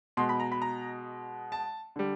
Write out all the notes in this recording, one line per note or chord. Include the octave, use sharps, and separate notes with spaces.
B2 G#3 C6
B5
A#5
B5
A#5
A5
D3 G3